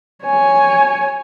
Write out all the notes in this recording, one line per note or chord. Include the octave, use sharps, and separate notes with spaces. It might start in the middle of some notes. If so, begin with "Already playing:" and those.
C#5 G#5